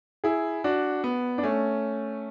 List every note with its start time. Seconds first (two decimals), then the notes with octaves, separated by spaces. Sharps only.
0.24 E4 G#4
0.64 D4 F#4
1.04 B3
1.38 D4
1.43 A3 C#4